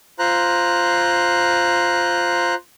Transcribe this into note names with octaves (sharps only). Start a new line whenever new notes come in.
F4 C5 A#5 F#6